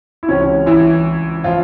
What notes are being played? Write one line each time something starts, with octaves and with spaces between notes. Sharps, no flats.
E4
C#2 C3 E3 C#4
E3 E4
F3 F4